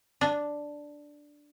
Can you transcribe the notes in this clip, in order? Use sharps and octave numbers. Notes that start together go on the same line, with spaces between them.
D4